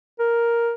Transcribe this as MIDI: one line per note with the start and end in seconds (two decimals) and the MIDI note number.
0.19 0.74 70